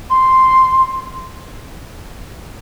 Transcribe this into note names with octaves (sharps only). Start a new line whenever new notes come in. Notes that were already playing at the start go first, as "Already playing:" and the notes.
C6